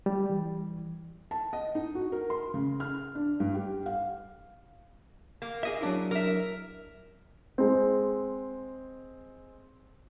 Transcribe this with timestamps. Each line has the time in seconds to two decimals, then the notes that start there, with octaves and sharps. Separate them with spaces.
0.06 G3
0.30 E3
1.31 A5
1.53 D#5
1.75 D#4
1.95 F#4
2.12 A#4
2.30 C6
2.54 C#3
2.80 F6
3.15 D4
3.40 G2
3.54 G4
3.86 F5
5.42 A#3
5.63 G#4 D#5 E5
5.81 F#3 D4 E4
6.11 A#4 E5
7.58 G#3 C4